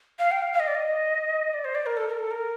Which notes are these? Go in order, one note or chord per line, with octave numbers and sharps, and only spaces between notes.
F5
G5
F5
F5
D#5
D5
D#5
D5
C5
D5
A#4
A4
A#4
A4
A#4